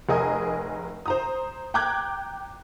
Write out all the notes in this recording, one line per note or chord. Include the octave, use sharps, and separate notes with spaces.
F1 G#4 A#4 D#5 G#5 D#6
C5 A#5 D#6
G5 A#5 D6 F#6 G#6